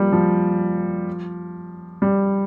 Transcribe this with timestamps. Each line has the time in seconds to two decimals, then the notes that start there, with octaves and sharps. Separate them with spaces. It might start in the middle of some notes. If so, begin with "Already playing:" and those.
Already playing: F3 G3 A#3
0.12 F3
2.02 G3